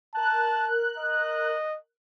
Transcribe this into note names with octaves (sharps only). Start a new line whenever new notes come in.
A#4 A5 F#6
D#5